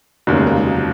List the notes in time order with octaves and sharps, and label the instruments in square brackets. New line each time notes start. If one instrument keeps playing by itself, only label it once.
[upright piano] F1 D#2 C#3 [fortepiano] F#3
[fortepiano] G#3
A#3
G#3
F#3
F3